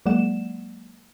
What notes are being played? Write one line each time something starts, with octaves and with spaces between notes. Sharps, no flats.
F#3 G#3 A#3 D5 F#5 E7